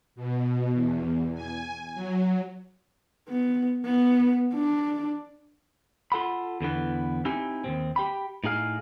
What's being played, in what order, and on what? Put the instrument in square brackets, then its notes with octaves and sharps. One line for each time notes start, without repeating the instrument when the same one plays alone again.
[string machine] B2
E2
G#5
F#3
[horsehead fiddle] B3
B3
D4
[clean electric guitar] F4 A4 F#5 B5
E2 D3 E3 B3
C4 D#4 E4 G4 G#5
D#2 A#2 C4
G4 G5 B5
A2 D#4 G#4 F5